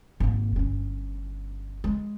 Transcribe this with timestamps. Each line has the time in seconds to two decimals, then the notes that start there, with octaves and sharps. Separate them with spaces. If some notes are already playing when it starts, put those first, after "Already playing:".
0.20 G#1 A#3
0.56 G1 C#4
1.84 G#3